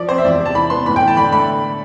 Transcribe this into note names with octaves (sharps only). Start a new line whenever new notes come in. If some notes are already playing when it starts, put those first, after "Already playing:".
Already playing: F3 D5
C4 C5
E5
E2 D5
C3
A5
E3 B5
B3 C6
A2 B5
G5
E3
A5
D3 B5
A3 B5